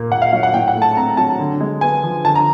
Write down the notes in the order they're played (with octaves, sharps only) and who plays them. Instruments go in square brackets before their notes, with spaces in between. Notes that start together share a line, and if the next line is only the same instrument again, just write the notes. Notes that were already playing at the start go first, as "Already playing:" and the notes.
Already playing: [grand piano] A#2 A#3
A#2 F#5
F5
F#3 F5
F#5
A2 G5
F#5
A3
A5
C4 A#5
F#3 A5
D3
G#3
B3 G#5
F3
D3 A5
A#5